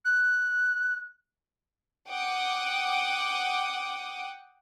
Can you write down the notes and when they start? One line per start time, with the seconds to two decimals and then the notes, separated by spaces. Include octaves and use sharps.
0.05 F#6
2.09 F#5 G5 D6 D#6